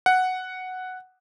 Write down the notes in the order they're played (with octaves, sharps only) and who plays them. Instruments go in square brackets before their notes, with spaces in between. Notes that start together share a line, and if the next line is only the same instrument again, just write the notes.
[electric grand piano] F#5